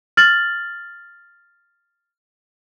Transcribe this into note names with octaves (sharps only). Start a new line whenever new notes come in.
F6 A6 F#7